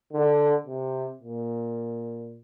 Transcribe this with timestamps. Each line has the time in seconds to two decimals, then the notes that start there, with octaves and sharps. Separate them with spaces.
0.13 D3
0.67 C3
1.21 A#2